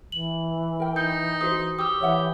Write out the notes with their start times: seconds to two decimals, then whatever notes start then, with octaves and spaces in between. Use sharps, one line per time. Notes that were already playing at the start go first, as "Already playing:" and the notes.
0.12 E3 F#7
0.80 A#4 G5
0.96 D#4 G6
1.41 F#4 B4 C5 D#6
1.79 G4 D#6 E6
2.00 E3 C#5 E5 F#5